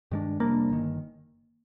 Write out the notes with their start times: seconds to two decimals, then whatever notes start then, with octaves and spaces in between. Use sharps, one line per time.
0.11 G2 D#3 G#3 D4
0.40 F2 C3 G3 A#3 D4
0.70 G1 D#3